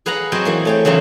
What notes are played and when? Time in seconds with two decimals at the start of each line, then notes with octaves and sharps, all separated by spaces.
0.06 G#4 B4 F5 F#5 A#5
0.32 F#3 C4 C#5 D#5 E5 G5
0.45 E3 A#3 G#4
0.65 A3 C#5 G5
0.85 E2 C#3 E3 F#3 C4